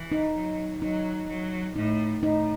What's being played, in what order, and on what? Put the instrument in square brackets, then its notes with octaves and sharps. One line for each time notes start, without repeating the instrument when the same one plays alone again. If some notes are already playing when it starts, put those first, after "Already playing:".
Already playing: [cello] E3
[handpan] D#4
[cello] F#3
[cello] F#3 [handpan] D#4
[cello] F#3
[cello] A2 [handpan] D#4
[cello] A2 [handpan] D#4